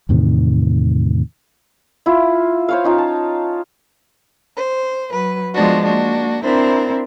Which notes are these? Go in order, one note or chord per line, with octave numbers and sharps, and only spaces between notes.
E2 A2 C3 D#3
E4 F4
C5 C#5 F5
C#4 D#4 F4
A5
C5
F#3 B4
F3 G#3 B3 D4 F#4
A#3 D4 F#4
C4 D4 E4 A#4 C5